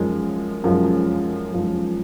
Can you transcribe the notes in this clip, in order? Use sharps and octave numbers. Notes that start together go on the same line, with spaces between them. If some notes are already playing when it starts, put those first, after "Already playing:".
Already playing: F#2 F3 G#3
F#2 F3 G#3
F#2 F3 G#3